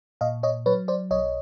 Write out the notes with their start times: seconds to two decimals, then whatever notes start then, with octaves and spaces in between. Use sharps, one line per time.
0.21 A#2 D#5 F5
0.43 C#5 D#5
0.66 F#3 B4 C#5
0.88 C5 D5
1.11 B1 C#5 D#5